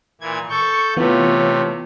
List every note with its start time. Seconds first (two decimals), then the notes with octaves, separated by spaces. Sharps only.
0.21 A#2 E3 G#6
0.50 A4 C#6 G6
0.96 C3 E3 A3 B3 F4 C#5